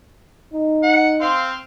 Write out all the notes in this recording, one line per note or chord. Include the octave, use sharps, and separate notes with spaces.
D#4
F#5
C4 F5 C6